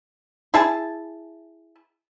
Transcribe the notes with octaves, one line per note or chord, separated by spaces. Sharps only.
E4 G#4 A5